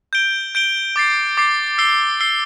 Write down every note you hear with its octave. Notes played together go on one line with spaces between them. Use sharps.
G6 D7 G7
G6 D7 G7
D6 A6 C7
D6 A6 C7
E6 C7 G7
E6 C7 G7